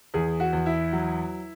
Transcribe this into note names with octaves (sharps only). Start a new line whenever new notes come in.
E2 G#4
F#4
E2
E4
F#3